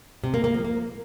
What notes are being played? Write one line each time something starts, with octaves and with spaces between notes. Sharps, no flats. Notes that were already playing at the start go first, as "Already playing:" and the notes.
C3
A#3
A#3
F3
A#3